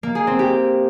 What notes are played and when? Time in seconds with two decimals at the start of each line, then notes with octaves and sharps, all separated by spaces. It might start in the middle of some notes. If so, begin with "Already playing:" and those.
0.03 A#3
0.15 G#4
0.27 C4
0.39 G4